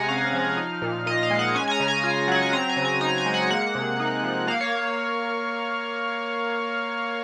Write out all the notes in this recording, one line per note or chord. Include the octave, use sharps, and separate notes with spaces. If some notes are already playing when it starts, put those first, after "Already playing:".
Already playing: C3 G#3 F#5 G#5 A#5
C#4 F5
F3
D#4
A#2
A#2 D#5
F5
G#3
F#5
C#4 G#5
G#5
A#5
C#3
G#5
F4
F#3 F#5
G#5
C4 A#5
G#5
C#3
G#5
D#4 A#5
G#5
G#3
F#5
A#3 F#5
C3
D#4
F3
A#3 F5
C#5